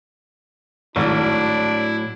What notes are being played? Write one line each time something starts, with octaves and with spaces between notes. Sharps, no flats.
G#1 A2 F#3 D4 E4